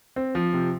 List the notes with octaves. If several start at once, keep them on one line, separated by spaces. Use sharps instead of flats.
C4
F3
C3